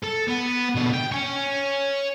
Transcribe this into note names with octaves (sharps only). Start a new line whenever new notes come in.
A4
B3
B2 D3
G5
C#5 G#5